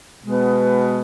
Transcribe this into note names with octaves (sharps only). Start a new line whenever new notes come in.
B2 G#3 B3